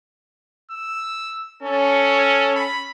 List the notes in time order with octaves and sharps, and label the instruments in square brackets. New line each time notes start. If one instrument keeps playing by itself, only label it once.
[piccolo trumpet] E6
[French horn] C#4 [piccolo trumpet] A4
[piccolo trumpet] B5